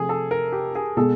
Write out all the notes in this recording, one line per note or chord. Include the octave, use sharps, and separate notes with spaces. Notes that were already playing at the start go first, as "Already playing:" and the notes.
Already playing: C3 F3 A3 G#4
A4
A#4
G4
G#4
B2 G#3 A4